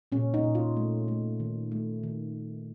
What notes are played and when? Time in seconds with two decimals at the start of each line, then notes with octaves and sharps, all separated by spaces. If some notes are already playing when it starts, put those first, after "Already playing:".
0.12 A#2 C#4
0.34 D#4
0.44 A#2
0.55 F4
0.77 A3
1.08 A3
1.40 D#3
1.72 A3
2.03 D#3